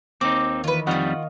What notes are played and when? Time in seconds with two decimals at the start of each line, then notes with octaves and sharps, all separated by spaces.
0.21 D#2 C4 D#4 D6
0.64 D#3 E3 F4 B4
0.87 F2 D#3 G3 F4 D#5 F5 F#5 C#6